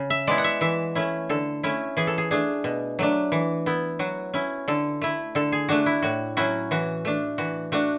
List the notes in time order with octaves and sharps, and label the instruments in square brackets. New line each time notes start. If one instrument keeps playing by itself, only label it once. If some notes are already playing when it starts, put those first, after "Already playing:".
Already playing: [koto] C#3
E5
G#3 B3 E4 D5
F#5
E5
E3 E5
A3 C#4 E4
D3 A4
A3 C#4 E4
E3 G#4
A4
G#4
A3 D4 G#4
B2
F#3 A3 D4
E3
B3 E4
F#3 F#4
C#4 E4
D3 A4
A3 E4
D3 A4
G#4
A3 D4 F#4
E4
A2 F#4
F#3 C#4 E4 F#4
E3 F#4
A3 D4
E3 F#4
A3 D4 F#4